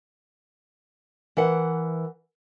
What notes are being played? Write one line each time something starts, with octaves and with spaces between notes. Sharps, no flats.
E3 A#4 F#5